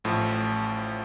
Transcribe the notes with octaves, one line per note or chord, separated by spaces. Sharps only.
A1 A2 F3